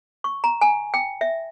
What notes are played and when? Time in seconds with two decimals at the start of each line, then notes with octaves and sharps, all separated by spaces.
0.24 C#6
0.44 A#5
0.61 G#5
0.94 G5
1.21 E5